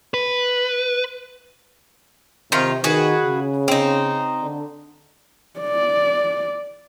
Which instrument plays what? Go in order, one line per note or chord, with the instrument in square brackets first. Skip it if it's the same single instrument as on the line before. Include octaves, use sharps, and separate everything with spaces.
[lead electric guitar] B4
[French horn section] C3 [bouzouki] D#3 F4
[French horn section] D#3 [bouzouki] F#4 G#4 B4
[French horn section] C#3
[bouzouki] C4 D#4
[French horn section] D3
[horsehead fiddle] D5